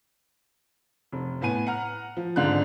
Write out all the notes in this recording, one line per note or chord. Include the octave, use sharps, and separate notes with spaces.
F1
A2 B3 G#5 D#7
F#5 A#5 F6
F3
G#1 G#2 D3 D4 F4 F#6